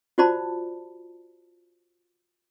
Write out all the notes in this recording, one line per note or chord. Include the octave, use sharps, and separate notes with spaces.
F4 F#4 C5 D5 A5 B5